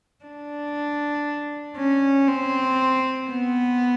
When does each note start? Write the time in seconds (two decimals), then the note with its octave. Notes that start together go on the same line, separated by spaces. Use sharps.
0.25 D4
1.77 C#4
2.28 C4
3.29 B3